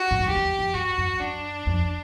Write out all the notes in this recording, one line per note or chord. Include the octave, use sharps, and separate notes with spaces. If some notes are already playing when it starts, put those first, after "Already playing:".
Already playing: F#4
G#2
G2
F#2 G4
F2
E2
F2
G2 F#4
F#2
F#2 D4
F2